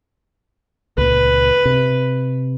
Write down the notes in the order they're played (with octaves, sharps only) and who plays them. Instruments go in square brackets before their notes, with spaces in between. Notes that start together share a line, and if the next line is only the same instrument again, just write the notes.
[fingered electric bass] C#2 A#2 [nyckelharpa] B4
[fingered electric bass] C3